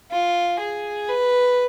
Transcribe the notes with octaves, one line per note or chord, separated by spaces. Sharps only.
F4
G#4
B4